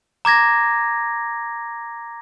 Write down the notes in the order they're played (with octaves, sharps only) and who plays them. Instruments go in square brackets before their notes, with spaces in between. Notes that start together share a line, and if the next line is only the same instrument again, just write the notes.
[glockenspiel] A#5 D6 G#6 A#6